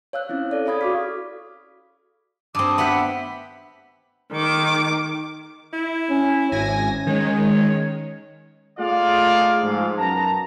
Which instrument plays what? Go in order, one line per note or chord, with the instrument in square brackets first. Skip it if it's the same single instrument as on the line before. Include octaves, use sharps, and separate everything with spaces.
[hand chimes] C#5 F5 E6 F#6
C4 C#4 E4
A4 D5
G#4 D5 F5 B5 D#6 G#6
F#4 C#6 D6 F6 B6
[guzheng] G2 C4 [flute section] D6 D#6
[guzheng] B3 G4 F#5 [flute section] E5
[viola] D#3 D6
[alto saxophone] E4
[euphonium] C#4
[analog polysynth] G#1 G#5 A#6 [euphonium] C#4
[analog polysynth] D#3 G#3 [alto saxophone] C#5
[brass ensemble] A3 D#4 F4 G#4 D5 F5
G#2 F3 F4
F#2 B2 B3 A5 A#5